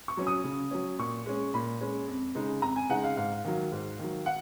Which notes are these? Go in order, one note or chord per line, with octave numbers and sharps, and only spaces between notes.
C#6
F#3 C#4
D#6
C#3
F#3 C#4
A#2 C#6
G#3 C#4
A#2 B5
G#3 C#4
F2
C#3 G#3 D#4
F2 A#5
G#5
C#3 G#3 D#4 F#5
F5
G#2 F5
D#3 F#3
G#2
D#3 F#3
F#5